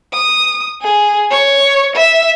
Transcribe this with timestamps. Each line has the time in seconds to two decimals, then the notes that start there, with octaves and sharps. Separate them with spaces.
0.13 D#6
0.82 G#4
1.31 C#5
1.96 E5